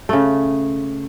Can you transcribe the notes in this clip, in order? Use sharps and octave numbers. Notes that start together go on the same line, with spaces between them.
C#3 A3